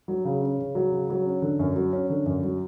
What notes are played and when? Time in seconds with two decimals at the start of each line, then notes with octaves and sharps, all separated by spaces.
0.08 F#3
0.25 C#3
0.42 C#4
0.59 C#3
0.75 F#3
0.92 C#3
1.10 F#3
1.26 C#4
1.42 D3
1.59 F#2
1.76 F#3
1.93 C#4
2.10 D3
2.26 F#2
2.43 F#3